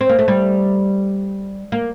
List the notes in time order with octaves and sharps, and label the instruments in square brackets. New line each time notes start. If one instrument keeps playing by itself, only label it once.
[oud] C4
A#3
A3
G3
A#3